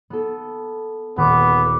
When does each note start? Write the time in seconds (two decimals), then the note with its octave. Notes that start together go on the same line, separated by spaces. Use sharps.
0.10 B3 A4
1.17 D#1 B3 D6